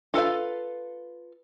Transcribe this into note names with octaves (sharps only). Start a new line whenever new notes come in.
F4 A4 B4 F5